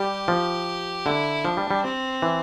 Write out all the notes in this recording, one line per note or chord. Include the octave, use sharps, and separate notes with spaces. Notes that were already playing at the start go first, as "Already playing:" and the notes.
Already playing: G3 G4
F3
D3 E4
F3 D4
G3
G3
C4
E3